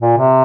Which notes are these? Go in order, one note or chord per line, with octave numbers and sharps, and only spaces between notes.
A#2
C3